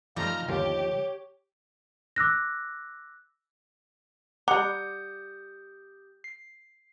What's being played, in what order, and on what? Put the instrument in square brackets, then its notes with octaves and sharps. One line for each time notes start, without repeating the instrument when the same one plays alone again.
[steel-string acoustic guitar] F3 D#4 [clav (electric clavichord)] G3 A3 C4 [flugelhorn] F5 [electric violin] A#5 F6
[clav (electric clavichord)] G1 D#2 F4 [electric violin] G4 [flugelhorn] C#5
[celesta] D6 E6 F#6 A#6
[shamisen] G3 A#5 [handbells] G4 D#6 G6 [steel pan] F#5 [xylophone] D6
[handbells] C7